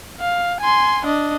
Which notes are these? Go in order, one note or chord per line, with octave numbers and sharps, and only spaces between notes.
F5
G#5 C6
D4 D#5